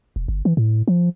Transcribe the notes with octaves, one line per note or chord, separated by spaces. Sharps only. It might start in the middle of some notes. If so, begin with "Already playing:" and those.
E1
G1
E3
A2
F3